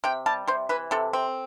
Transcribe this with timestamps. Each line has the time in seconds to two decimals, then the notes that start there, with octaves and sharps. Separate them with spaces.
0.04 C3 G5
0.26 G3 A5
0.48 C3 C5
0.69 E3 B4
0.91 C3 A4
1.13 C4